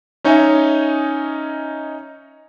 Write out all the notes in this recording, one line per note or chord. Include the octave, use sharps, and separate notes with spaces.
C#4 D#4 C#5 D#5 E5 G#5